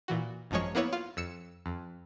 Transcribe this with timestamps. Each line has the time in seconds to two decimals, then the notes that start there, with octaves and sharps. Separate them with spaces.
0.08 A#2 E3 F#4
0.51 G#1 F#2 F3 G#3 C#5
0.75 A#3 B3 E4 B4 C#5
0.93 F4
1.17 F2 E6 C#7 E7
1.66 F2